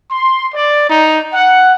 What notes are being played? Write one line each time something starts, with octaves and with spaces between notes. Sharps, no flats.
C6
D5
D#4
F#5